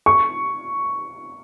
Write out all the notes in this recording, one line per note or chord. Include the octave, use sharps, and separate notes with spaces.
C#6